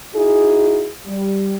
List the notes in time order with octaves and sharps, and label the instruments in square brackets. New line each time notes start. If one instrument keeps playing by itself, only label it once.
[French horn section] D#4 E4 F#4 G#4
G3